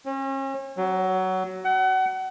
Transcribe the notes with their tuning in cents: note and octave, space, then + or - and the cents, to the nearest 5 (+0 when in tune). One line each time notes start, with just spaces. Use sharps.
C#4 -40
F#3 +15
F#5 +30